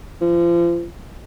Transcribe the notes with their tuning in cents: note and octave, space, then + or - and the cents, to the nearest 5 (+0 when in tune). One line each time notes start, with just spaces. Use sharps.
F3 -35